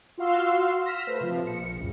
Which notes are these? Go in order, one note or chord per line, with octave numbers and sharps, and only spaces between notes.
F4 F#4 F5 C6 E6
F6 A#6 B6 E7
A3 B4 C5
C3 F3
A#1 C#7
C#2 G2